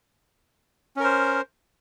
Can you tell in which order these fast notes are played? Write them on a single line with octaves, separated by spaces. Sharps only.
C#4 A#4 C5